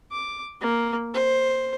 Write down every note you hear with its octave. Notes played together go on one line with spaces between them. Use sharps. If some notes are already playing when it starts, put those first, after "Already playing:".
D6
A#3
C5